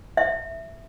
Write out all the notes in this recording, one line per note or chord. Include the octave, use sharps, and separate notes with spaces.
E5